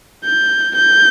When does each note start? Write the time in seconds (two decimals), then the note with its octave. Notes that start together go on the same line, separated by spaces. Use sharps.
0.25 G6
0.76 G6